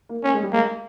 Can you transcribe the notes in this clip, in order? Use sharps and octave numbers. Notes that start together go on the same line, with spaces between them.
A#3
A#3 C#4
G#3
G3
G#3 A#3